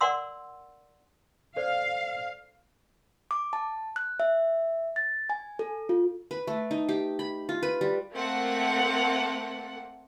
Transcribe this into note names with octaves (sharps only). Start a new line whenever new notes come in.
A#4 D5 F#5 C6 E6
A4 C5 D5 F5
D6
A5
F#6
E5
A6
G#5
A4
F4
B4
A3
D#4
G4
B5
F4
B4
G3
A3 A#3 C4 F#5